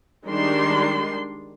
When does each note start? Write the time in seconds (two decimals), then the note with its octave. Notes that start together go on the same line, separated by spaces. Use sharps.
0.25 D#3 G3 G#3 D4 C6